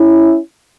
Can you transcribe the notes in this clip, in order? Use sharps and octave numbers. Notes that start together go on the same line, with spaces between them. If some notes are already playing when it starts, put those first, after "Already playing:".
Already playing: C#4 E4